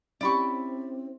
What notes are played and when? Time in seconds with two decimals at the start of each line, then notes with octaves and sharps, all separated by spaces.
0.21 C4 C#4 E4 G4 D5 B5 C#6